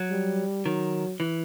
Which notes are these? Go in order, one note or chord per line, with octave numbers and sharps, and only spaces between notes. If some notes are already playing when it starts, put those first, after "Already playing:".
Already playing: F#3
G3
D#3 F#3
E3